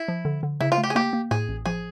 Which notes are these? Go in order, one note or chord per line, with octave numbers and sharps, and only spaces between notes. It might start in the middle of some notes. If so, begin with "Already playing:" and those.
Already playing: E4
F3
D3
D3
C#3 E4
F4
A3
G4
G#4
A#3 G4
A#3
A2 G#4
A1
F3 G#4